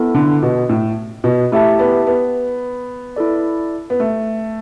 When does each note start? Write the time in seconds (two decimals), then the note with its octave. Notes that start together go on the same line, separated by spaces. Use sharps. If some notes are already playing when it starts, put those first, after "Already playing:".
Already playing: B3 E4 A4
0.15 D3
0.43 B2
0.69 A2
1.24 B2
1.52 A3 E4 G4 E5 A5
1.79 B3
2.07 B3
3.16 E4 A4 D5
3.90 B3
4.00 A3